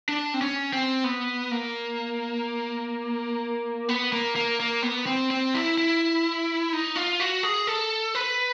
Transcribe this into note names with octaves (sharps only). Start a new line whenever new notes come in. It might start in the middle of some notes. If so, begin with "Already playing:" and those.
D4
C4
C#4
C4
B3
A#3
B3
A#3
A#3
A#3
B3
C4
C4
E4
E4
D#4
F4
F#4
G#4
A4
B4